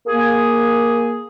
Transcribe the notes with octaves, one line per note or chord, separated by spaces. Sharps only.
A#3 G#4